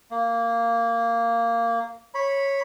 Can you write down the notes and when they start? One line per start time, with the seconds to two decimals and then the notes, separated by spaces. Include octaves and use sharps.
0.11 A#3
2.14 C#5 B5